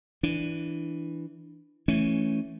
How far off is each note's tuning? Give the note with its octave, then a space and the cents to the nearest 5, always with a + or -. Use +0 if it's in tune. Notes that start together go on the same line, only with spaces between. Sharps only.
E3 +0 D4 +0
E3 +0 A3 +0 C#4 +0